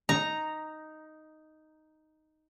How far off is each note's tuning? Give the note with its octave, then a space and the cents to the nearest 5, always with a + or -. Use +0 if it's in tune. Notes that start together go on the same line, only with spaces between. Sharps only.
D#4 +0 A#5 +0